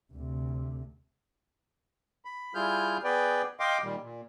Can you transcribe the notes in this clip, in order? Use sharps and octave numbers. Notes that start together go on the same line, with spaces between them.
D2 C3
B5
G3 E4 F4 G#4 F6 G6
B3 G#4 B4 D5 G5
D#5 F5 G5 C6 D6
A#2 D#3 G3
A#2